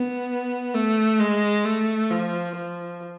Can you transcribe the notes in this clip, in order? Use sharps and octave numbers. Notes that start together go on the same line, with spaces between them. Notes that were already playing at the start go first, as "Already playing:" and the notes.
Already playing: B3
A3
G#3
A3
F3
F3